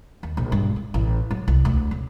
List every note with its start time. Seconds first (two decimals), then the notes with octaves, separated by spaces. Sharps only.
0.23 D#2
0.37 A#1
0.52 G2
0.76 G3
0.94 A1
1.31 F#3
1.48 C2
1.65 D2
1.91 C#3